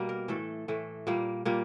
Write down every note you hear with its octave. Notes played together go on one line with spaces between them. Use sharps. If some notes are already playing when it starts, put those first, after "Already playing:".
Already playing: B2 G3 A#3
A#4
A2 E3 A3 A4
A2 E3 A3
A#2 G3 A#3
A#2 G3 A#3